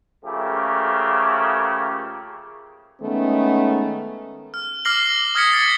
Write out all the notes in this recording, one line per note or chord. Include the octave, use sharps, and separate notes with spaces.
C#3 F3 A3 A#3 G4 A4
D#3 G#3 A3 B3 C#4
F6
D6 F6 A#6 C7 F#7 G7
D#6 F6 G#6 A#6 B6 C#7
G#6 A6 C#7